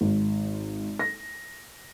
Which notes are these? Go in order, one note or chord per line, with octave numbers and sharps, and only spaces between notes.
G#1
A#6